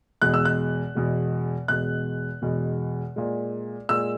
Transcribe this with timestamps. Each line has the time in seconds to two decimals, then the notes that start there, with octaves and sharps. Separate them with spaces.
0.22 E2 B2 G#3 F#6
0.34 E6
0.45 F#6
0.95 E2 B2 G#3
1.68 E2 B2 G#3 F#6
2.42 E2 B2 G#3
3.16 A#2 G#3
3.89 A#2 G#3 E6